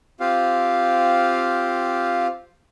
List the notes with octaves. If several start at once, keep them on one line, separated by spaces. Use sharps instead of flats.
C4 F4 G4 F5